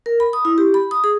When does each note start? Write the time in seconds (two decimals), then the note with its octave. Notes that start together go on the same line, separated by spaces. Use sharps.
0.06 A#4
0.20 B5
0.33 D#6
0.45 E4
0.58 G4
0.74 B5
0.91 D#6
1.04 G#4